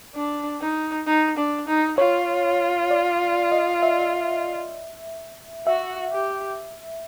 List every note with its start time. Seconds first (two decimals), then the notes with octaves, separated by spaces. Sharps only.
0.15 D4
0.61 D#4
1.07 D#4
1.37 D4
1.68 D#4
1.98 F4 C#5
2.91 D5
3.52 D#5
3.83 E5
5.67 F#4 E5
6.12 G4